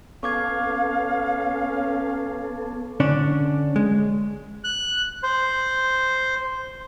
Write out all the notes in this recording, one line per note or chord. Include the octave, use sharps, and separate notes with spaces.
B3 C#4 A4 F5 C#6 D6 G#6
D3 C#4 D4
G#3
F#6
C5